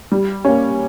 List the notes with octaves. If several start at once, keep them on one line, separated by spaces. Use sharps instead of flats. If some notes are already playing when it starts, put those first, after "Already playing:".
G3
A#3 C#4